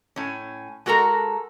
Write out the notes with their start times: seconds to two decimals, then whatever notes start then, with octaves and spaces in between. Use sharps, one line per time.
0.16 A2 C#4
0.86 G#3 F#4 A4 A#4 A#5